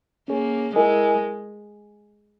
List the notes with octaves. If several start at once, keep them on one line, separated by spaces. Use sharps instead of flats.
A#3 C#4 G#4 C#5
G#3 E4 A#4 D#5 G#5